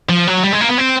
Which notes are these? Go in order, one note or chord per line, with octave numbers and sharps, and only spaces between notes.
F3
F#3
G3
G#3
A#3
B3
C4